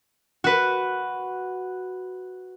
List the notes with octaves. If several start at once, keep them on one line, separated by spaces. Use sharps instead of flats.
F#4 B4